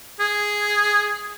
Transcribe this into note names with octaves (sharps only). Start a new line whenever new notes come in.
G#4